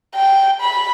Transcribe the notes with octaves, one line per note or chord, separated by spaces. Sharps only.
G5
B5